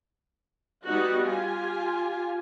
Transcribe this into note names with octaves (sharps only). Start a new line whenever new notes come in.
G3 B3 D#4 F#4
F4 G4 G#5